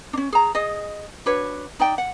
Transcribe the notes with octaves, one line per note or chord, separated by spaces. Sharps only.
C#4 D4
G#4 A#5
G#4 D#5
D4 F#4 B4 C#5
D#4 D5 G5
F#5